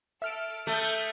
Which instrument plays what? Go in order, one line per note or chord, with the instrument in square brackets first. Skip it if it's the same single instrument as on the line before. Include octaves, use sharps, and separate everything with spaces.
[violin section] A4 [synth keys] E5 F6 D7
[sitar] A3 [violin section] D#6 F#6 G6